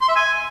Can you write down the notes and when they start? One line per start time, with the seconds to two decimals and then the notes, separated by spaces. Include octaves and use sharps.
0.01 C6
0.09 E5
0.16 G#5